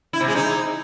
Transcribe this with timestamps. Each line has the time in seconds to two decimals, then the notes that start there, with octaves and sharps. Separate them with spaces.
0.13 E4
0.21 C3
0.28 G#3
0.35 D#4